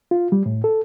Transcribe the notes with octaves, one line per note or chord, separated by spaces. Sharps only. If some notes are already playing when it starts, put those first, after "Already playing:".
F4
G3
A2
A4